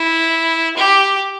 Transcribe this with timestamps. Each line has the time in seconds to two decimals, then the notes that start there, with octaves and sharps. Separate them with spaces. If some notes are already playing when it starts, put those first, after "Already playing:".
Already playing: E4
0.77 G4